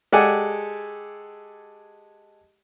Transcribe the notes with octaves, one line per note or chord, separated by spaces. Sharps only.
G#3 G4 A4 D5 F#5 G#5